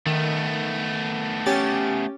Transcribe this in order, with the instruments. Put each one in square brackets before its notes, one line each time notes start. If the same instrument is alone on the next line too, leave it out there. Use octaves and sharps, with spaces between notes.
[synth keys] D#3 [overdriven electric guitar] A3 B3
[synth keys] C#4 G4 A6